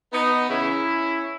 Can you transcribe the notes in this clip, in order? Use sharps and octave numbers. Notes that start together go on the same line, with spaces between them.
B3 D#4
C#3 E3 C#4 E4